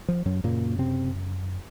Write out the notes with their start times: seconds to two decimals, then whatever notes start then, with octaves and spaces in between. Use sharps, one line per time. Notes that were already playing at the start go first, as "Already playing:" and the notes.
0.08 F3
0.26 F#2 F#3
0.44 F#2 A#2 C#3 A#3
0.78 C3 C4